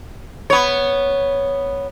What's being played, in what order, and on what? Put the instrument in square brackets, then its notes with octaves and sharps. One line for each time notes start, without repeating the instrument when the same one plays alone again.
[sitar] B3 C#5